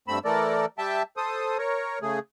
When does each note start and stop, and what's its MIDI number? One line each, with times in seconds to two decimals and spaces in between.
0.08 0.19 43
0.08 0.19 57
0.08 0.19 60
0.08 0.19 83
0.08 0.19 88
0.25 0.66 52
0.25 0.66 57
0.25 0.66 69
0.25 0.66 70
0.25 0.66 74
0.78 1.03 55
0.78 1.03 76
0.78 1.03 79
0.78 1.03 81
1.17 1.58 69
1.17 1.58 72
1.17 1.58 87
1.58 1.99 70
1.58 1.99 73
2.02 2.19 49
2.02 2.19 57
2.02 2.19 68